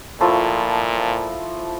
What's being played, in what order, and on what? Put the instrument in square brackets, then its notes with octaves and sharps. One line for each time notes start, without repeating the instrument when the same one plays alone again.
[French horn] A#2 [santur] F3 A3 E4